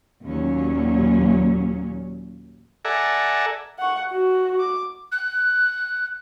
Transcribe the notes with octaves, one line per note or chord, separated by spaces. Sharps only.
D#2 A#2 F#3 C#4
A4 D5 E5 F#5 G#5 A#5
F#5 C#6
F#4
D6
F#6